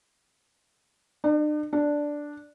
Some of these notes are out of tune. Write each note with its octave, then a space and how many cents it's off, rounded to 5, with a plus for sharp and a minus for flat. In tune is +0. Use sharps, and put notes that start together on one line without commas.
D4 +45
D4 +0